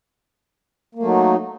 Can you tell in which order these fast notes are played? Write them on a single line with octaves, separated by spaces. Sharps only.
A#3 A3 F#3 D#4